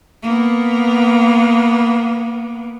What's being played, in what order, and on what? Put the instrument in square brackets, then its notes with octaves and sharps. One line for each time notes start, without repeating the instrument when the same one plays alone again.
[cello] A#3 B3